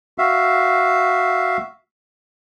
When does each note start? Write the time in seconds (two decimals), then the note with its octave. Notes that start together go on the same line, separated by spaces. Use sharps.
0.18 F#4 E5 F5